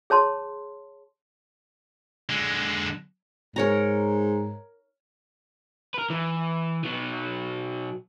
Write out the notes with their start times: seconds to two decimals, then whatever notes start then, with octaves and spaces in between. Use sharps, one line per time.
0.10 G#4 C#5 A5 C6
2.29 D3 G#3
3.56 G#2 A#4 C#5 A#5
5.94 A#4 B4
6.10 E3
6.84 B2 F#3